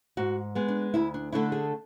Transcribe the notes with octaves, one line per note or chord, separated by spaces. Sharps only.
G#2 F#4
G#3 B3
D4
D2 E4
D4
D3 A3 D4 E4
G#4